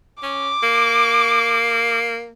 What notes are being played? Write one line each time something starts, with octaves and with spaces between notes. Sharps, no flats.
C#4 D6
A#3